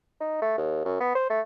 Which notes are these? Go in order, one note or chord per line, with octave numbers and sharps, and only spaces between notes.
D#4
A3
D#2
F#2
B3
C5
A3